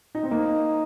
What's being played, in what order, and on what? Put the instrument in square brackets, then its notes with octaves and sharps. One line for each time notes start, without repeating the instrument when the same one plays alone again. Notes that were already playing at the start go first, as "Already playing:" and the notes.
[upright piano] D#4
C4
[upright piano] A#3 [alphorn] D#4